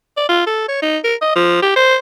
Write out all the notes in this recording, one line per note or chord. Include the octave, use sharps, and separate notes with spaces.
D5
F4
A4
C#5
D#4
A#4
D#5
F3
G4
C5